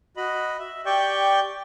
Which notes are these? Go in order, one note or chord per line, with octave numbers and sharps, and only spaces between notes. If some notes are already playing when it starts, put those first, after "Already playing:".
F#4 D#5 B5
E5
G4 D5 G5 C#6 G6